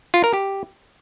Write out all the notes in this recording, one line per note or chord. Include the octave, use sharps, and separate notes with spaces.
F4
A#4
G4